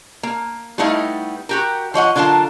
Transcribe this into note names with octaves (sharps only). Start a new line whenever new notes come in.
A#3
G3 A3 B3 D#4 E4 F5
F#4 G4 A#4
F3 C#5 D#5 F#5
D3 F#3 F4 A#4 A5